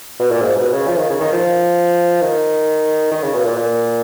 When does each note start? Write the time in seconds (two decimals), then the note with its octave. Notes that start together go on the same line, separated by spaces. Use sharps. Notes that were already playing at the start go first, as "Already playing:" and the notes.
0.20 B2
0.31 A#2
0.42 G#2
0.57 B2
0.72 C#3
0.87 F3
0.97 D#3
1.09 C#3
1.21 D#3
1.32 F3
2.21 D#3
3.12 D#3
3.23 C#3
3.34 B2
3.45 A#2
3.56 A#2